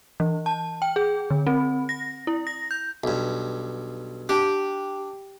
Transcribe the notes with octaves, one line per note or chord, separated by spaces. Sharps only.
E3
A5
G5
G#4
D3
C4
A#6
E4
A#6
G6
B1 G2
D4 G4